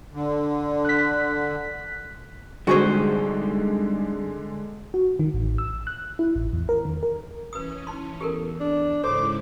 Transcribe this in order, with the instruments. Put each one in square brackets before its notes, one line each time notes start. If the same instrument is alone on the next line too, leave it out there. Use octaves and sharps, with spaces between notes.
[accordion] D3
[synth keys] F#6 B6
[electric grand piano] D3 G#3 [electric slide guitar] G3 C4 D#4 [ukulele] F#4 G#4 C5
[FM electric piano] F#4
D#3
A1
E6
F#6
E4
A1
E2
A#4
D#3
A#4
[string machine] E3 C#4 [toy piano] B4 D#6
[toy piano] D#4 C6
[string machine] E2 [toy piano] G4 A4 A#4
[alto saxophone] D4
[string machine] G#2 C#3 E4 [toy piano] A4 C#5 [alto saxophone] C5 [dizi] D6